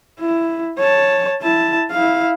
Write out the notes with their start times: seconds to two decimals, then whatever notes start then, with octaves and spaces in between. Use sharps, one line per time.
0.20 E4
0.78 C#5 A5
1.42 E4 A5
1.91 E4 F5